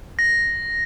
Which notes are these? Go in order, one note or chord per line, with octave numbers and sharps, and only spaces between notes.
A#6